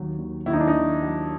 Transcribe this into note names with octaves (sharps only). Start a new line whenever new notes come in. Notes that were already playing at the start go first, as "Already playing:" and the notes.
Already playing: D#2 D#3 F#3
D#2
D#2 E4
D#4
D4
D#4
D#3
F#3